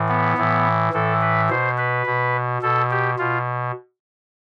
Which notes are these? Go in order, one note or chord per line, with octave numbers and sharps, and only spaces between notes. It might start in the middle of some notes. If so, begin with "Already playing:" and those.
Already playing: A2 E3
B3
A2 E3
A2 E3 A4
B4
B2 C5
B4
B2
B2 A4
G4
B2 F4